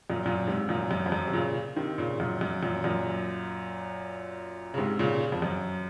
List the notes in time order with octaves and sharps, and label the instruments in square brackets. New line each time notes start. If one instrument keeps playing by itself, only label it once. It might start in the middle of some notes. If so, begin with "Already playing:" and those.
[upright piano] F#2 A#2
F#2 A#2
G#2 C3
F#2 A#2
F#2
F2
F#2
C3
A#2 C#3
C3 D#3
A#2 C#3
F#2 A#2
F#2
F#2 A#2
F#2 A#2
C#3
G#2 C3
A#2 C#3
F2
F#2